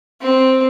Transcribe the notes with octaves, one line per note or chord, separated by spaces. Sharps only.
C4